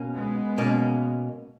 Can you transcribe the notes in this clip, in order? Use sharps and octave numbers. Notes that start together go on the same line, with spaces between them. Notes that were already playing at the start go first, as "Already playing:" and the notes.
Already playing: B2 A#3 C#4
G#3 B3
B2 A#3 C#4